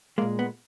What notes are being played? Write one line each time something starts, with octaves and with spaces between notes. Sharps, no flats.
A#2 G#3 A#3
B3